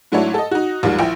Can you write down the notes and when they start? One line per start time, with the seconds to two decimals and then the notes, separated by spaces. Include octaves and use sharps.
0.12 G#2 F#3 A3 D4 E4 C#5
0.34 A4 D#5
0.51 D#4 F#4
0.83 D#2 G#2 D#3 F3 G3
0.99 A#1 E4 G5